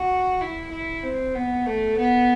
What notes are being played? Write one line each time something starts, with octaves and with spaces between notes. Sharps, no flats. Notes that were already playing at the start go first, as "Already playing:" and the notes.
Already playing: F#4
E4
E4
C4
B3
A3
B3